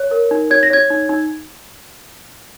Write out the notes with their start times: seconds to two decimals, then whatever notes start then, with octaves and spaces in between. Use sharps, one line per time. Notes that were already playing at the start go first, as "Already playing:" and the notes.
Already playing: C#5
0.11 A#4
0.31 D#4
0.50 C#5 G#6
0.63 A#6
0.70 C#5 G#6
0.90 D#4
1.09 D#4